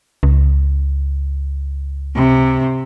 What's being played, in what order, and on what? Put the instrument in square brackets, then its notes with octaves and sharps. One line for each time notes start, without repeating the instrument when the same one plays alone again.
[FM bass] C#2
[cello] C3